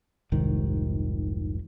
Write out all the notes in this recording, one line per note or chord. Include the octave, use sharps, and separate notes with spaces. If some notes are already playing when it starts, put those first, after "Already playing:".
F1 C2 G#2 D#3